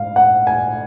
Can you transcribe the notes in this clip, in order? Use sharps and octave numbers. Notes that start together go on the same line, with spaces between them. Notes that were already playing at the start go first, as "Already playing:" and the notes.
Already playing: G#2 F5
F#5
G#5